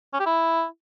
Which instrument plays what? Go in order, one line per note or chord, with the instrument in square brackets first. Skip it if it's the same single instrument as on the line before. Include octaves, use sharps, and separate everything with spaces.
[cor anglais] C#4
G4
E4